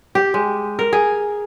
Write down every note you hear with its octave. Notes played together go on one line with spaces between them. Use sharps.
G4
G#3
A#4
G#4